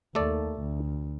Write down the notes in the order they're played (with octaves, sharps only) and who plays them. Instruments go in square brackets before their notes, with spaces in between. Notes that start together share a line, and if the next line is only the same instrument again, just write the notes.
[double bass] D#2 [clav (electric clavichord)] A3 A4 D5
[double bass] D2